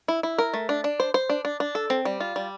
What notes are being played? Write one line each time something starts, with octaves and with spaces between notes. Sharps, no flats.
E4
E4
A#4
A3
D4
D4
C5
C5
D4
D4
D4
A4
C4
G3
F4
G3